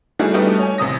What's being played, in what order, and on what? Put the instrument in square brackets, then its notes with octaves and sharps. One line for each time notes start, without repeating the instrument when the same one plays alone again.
[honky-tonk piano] G3 A3 D4 D#4 F#4 G#4
G3 A3 B3 D#4 F#4 G4
C#5 G#5
A1 C3 D#6 A#6